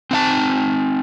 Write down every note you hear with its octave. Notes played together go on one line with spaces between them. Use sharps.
C4 D#4 F5 A5